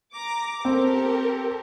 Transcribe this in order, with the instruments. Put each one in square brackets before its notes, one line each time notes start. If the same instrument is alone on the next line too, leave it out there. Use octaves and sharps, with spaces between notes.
[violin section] A#5 D6
[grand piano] C4 [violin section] G4 A4 A#4